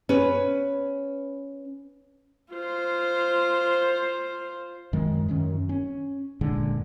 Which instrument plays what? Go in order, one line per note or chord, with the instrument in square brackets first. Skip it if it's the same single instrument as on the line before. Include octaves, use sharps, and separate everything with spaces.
[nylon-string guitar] C#4 B4
[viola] F4 C5
[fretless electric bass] F#2 D#3 G#3
F#2 D#3 C#4
C#4
F#1 A#2 D3 G#3